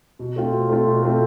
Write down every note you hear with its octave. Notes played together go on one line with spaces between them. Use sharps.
B2
A3 C4 F4
B2
A3 C4 F4
B2
A3 C4 F4